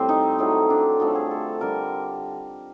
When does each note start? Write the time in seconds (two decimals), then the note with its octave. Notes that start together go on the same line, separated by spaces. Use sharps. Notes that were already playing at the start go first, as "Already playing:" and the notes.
Already playing: A2 G3 C4
0.09 D#4
0.39 A2 F#3 A3 D#4
0.70 D4
1.00 D3 F3 A3 D#4
1.15 G#4
1.31 A4
1.61 D3 G3 A#4